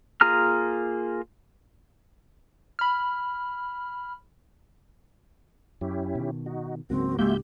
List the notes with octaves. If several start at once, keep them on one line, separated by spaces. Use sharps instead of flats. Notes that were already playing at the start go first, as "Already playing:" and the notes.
A#3 F4 G#4 A#5 F6
B5 F6
F#2 C#4 E4 G4
B2 D#3
D#4 F#4
C#2 G#2 C#3 F#3 A#3 C4 F#4
G#3 A#3 F#4 G4 E5 G6